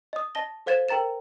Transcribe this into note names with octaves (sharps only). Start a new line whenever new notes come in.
D#5 D#6
D#5 A5 A#6 G7
A4 C5 F5 G#6 A6 E7
A#4 G5 A#5 A6 E7